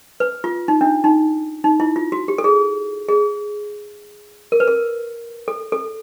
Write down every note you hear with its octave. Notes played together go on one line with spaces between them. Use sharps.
B4
F4
D#4
D4
D#4
D#4
E4
F4
F#4
G4
A4
G#4
G#4
A#4
B4
A#4
A4
A4